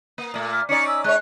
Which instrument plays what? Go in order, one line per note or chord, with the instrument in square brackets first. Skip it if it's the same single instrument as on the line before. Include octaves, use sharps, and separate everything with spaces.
[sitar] A#3
A#2 A3
[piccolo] F6
[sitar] C#4 D#4 D5 [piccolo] C#7
[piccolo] E6
[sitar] G#3 C#5 [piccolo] F#6